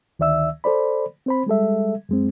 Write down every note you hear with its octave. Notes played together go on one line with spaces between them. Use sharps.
D2 D#3 D5 E5 E6
A4 C5 D5 B5
C4 C5 B5
G3 G#3 A4 E5
F#2 G#3 C4